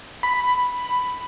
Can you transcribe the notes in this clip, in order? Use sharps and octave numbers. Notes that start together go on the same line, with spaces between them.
B5